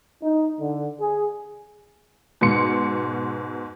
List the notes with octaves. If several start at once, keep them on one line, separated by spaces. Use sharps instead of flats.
D#4
D3
G#4
G#2 B2 C6 C#7